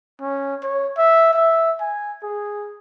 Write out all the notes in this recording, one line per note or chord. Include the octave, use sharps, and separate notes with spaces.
C#4
C#5
E5
E5
G#5
G#4